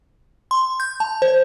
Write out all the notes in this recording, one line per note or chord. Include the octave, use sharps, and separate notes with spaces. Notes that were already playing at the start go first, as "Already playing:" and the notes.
C6
G6
A5
C5